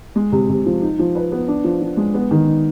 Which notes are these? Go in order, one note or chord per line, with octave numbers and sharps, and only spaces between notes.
G#3
C3
C3
F3
D#4
F3
B4
B3
D4
F3
F3
G#3
B3
D#3
D#4